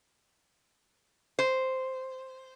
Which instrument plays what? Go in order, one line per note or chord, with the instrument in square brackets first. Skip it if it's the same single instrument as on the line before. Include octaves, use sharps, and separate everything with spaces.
[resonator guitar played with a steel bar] C5